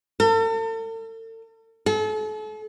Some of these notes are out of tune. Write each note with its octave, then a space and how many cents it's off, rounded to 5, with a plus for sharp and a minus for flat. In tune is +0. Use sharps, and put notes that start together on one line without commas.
A4 +40
A4 -40